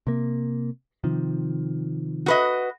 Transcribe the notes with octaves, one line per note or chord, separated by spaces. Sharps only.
C3 A#3
C3 D#3 F3
F#4 B4 D#5